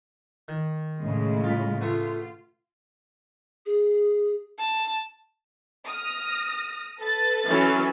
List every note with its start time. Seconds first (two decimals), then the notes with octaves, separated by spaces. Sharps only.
0.48 D#3
1.00 A2 C#3 G#3
1.44 F4 B5
1.81 A3 B3 F4
3.66 G#4
4.59 A5
5.86 D#6 F6 A#6
6.99 A4 B4 A6
7.46 E3 F#3 C#4